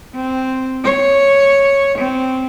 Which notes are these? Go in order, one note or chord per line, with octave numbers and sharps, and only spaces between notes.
C4
C#5
C4